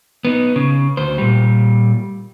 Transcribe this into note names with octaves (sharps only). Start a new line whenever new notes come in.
B3 D#4
C#3
D2 C5
A#2 G3